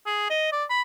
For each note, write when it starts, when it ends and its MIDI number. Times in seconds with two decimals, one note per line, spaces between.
0.06 0.26 68
0.30 0.51 75
0.52 0.64 74
0.69 0.82 83